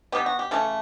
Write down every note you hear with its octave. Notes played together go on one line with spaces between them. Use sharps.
B2 G3 B3 G4
F#4
G4
C#3 E3 A3 A4